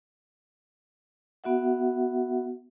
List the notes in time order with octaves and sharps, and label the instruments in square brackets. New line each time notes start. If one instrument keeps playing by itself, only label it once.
[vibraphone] B3 F#4 E5 F#5